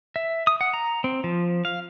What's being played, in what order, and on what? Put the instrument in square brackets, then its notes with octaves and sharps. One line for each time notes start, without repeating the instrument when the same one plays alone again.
[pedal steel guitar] E5
D#6
F#5
A#5
C4
F3
F5